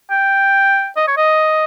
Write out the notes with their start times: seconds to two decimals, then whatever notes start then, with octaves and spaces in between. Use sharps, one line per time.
0.11 G5
0.97 D#5
1.08 C#5
1.17 D#5